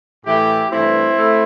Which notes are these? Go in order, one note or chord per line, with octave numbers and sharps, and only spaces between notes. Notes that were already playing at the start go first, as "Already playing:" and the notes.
A2 E3 A3 E4 G4
G2 E3 A3 C4 E4
A3